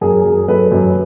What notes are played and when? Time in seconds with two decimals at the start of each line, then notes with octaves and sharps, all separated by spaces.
0.01 F#2 G#4 A#4
0.25 F#2
0.48 F#2 A4 B4
0.72 F#2